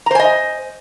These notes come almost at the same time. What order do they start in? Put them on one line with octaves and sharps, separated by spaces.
A#5 C5 G#5 D#5